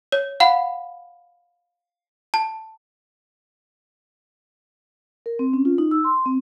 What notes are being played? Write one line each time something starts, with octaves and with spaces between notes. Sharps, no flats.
C#5
F5 F#5 B5
A5
A#4
C4
C#4
F4
D#4
E6
C6
C4